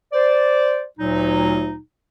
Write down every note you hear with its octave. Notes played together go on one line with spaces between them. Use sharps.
C5 D5
D2 A#2 F#3 D#4